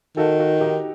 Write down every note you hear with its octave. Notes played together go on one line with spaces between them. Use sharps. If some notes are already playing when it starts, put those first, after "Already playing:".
D#3 F#4 A4
F#4 A4
D#4 G4